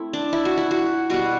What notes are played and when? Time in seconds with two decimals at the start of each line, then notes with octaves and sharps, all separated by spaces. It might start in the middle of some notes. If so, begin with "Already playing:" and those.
Already playing: A3 C4 E4
0.13 D4
0.33 E4
0.45 F#4
0.57 E4
0.71 F#4
1.10 B2 G3 B3 F#4